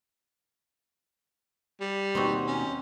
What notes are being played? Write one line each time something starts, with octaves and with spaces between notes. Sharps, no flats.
G3
D#2 B2 C4 D#4 F#4
C#4